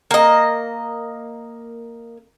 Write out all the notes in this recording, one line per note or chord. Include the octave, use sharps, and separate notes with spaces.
A#3 D#5